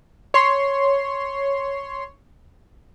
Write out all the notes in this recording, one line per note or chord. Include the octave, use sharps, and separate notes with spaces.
C#5 C6